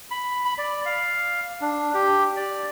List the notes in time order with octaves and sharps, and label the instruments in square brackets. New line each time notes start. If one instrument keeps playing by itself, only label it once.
[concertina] B5
B5
D5
F5
D4
G4
D5